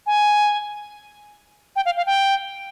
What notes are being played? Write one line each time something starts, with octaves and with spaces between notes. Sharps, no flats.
G#5
G5
F5
F5
G5